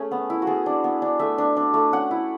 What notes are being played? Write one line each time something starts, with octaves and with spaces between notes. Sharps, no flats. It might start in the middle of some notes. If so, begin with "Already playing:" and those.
Already playing: A3 C#4 G#4
B3
E4
F#4
B3 G#4
D4
B3
D4
A3 E5
D4
D4
A3
C#4 F#5
E4